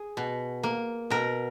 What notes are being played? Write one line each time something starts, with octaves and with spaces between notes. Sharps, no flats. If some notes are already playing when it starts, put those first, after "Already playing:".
Already playing: G#4
B2
A#3
B2 A#4